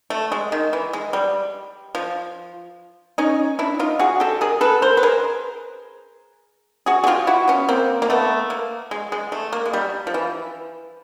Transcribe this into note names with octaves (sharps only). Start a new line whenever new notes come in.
A3
G#3
D#3
E3
G#3
G3
F3
C#4 D#4
D4 E4
D#4 F4
F#4 G#4
G4 A4
G#4 A#4
A4 B4
A#4 C5
B4
G#4 A#4
F#4 G#4
G#4
F4 G4
E4 F#4
B3 C#4
A#3 C4
A#3
A3 B3
A#3
G#3
G#3
A3
A#3
G#3
G3
F3
E3